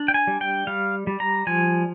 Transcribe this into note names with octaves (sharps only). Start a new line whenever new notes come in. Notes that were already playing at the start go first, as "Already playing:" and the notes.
Already playing: D4
G5
G#5
G3
G5
G3 F5
G3
A#5
F3 G#5